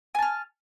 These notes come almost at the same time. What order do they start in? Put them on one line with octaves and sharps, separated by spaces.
G#5 A5 F6